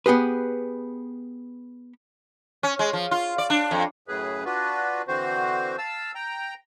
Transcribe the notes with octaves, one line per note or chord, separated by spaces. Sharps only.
B3 G4 G#4 B4
C#4
G#3
F3
F4
D5
D4
F2
F#2 A2 C#3 G#4 B4
D4 F4 F#4 B4
D3 E3 C4 F#4 C5
F5 A5 E6
G5 A#5